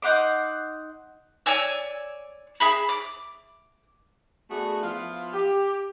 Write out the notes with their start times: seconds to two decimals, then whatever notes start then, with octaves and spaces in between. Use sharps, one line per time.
0.02 D#4 F#5 C6 D6
1.46 C#5 D5 G#5 E6
2.60 G#4 E5 B5
2.89 D6
4.49 A3 B3 D4 F#4 G#4
4.83 F3 B3 E4 F4
5.33 G4